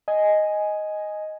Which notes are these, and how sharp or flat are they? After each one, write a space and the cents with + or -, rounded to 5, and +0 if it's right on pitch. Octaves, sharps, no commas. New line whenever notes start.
D#5 +0 G#5 +0